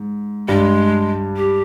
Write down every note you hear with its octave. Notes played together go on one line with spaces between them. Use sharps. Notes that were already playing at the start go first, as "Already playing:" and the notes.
Already playing: G#2
G2 G3 G#3
G4